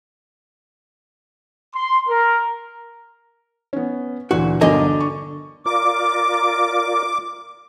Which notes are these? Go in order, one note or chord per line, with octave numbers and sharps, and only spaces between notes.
C6
A#4
B3 C#4
D2 A#2 E3 F#4
G1 D3 F#3 A#4 D#5 G#5
C#6
F4 A#4 D5 D6